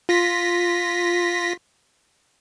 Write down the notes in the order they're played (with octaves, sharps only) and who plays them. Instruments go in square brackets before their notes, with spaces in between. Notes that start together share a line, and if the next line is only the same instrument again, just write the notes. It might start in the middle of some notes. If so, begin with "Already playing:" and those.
[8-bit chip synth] F4 A#6 B6